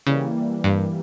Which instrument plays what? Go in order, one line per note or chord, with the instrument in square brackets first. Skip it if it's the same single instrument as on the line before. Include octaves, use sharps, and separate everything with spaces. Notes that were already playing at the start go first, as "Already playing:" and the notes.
[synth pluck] C#3 [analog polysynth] E3 G3 A#3
[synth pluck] G2